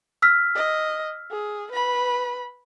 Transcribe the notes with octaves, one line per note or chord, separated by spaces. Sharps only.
E6 F6 B6
D#5
G#4
B4 B5